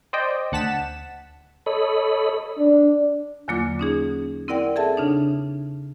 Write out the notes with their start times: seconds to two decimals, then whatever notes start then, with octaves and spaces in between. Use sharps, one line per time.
0.13 C5 D5 D#5 G5
0.52 D2 F#5 A5 B6 E7
1.66 A4 C#5 D#5 B5
2.58 D4
3.48 E2 D3 F#3 A#3 F4 D6
3.79 C#4 D#4 G#4
4.48 C4 E4 A#4 D5 F#5 G5
4.76 G#4 A4 E5 A5
4.97 C#3 D4 D#4